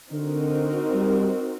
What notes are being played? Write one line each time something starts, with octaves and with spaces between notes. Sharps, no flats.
D3 C4 D#4 F#4 A#4
G3